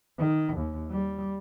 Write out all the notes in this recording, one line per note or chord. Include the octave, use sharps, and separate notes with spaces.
D#3
D#2
G3